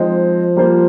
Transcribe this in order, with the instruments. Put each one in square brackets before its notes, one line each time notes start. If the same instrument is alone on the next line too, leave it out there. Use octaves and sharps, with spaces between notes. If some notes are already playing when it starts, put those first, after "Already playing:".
Already playing: [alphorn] F3 [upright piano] G#3 C4 D#4
[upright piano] G3 A#3 F4 C5